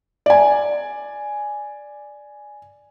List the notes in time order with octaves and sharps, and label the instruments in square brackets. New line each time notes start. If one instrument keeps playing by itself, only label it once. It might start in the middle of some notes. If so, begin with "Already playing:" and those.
[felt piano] D5 G#5